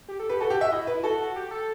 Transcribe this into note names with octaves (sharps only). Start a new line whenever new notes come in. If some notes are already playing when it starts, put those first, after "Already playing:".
G4
A4
G4 B4
F#4 A4
G4
E5
E4 D#5
B4
E4
F#4 A4
G4
A4